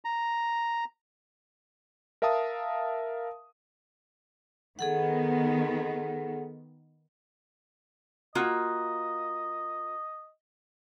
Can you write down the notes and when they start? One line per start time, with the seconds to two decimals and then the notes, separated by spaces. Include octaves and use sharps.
0.05 A#5
2.22 A#4 E5 F5 A5 D#6
4.79 D#3 B3 G#4 A4 F#5
8.35 A#3 F4 F#4 D#5